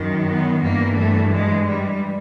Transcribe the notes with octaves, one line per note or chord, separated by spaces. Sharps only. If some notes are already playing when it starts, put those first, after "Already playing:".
Already playing: F#2 D#3
B3
G2 E3 A#3
A3
G#3
G3